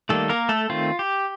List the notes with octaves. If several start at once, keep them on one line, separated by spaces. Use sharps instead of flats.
D#3 G3 A3 A#3 A4
A#3 A#4
A3 A4
D#3 A3 C4 F4
G4